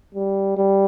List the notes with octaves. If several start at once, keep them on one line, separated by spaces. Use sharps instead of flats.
G3
G3